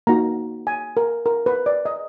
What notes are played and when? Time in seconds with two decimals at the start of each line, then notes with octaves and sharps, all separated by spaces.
0.07 A#3 D#4 F#4 A#5
0.67 G#5
0.97 A#4
1.26 A#4
1.46 B4
1.66 D5
1.85 D#5